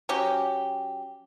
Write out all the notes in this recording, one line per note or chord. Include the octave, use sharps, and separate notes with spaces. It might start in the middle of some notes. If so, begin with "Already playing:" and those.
F#3 C#4 G4